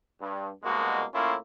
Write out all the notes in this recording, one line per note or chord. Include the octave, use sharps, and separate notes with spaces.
G2
C2 B2 G#3 A#3 F#4
A2 A#3 C#4 E4 F4